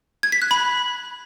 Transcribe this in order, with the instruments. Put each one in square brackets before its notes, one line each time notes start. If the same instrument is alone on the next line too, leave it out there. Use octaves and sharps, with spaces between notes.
[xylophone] G#6
B6
F#6
B5